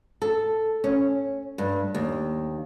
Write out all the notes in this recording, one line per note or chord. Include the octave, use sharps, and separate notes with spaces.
A4
C#4
G2
D#2